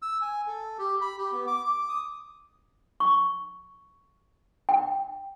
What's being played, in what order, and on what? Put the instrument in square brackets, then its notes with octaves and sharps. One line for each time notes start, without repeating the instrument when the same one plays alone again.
[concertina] E6
G#5
A4
G4
B5
G4
B3
D6
D6
D#6
[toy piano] C#6
G5